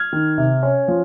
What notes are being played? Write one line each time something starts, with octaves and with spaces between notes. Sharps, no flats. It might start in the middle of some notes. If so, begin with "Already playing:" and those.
Already playing: F6 G#6
D#3
C3
C#4
F3